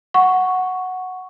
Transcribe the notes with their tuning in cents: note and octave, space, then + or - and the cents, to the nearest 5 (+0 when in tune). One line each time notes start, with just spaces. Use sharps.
F#5 +0 C#6 +0